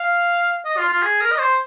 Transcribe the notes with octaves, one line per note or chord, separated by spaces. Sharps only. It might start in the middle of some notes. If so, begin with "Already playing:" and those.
Already playing: F5
D#5
F4
F4
G#4
A#4
D#5
C5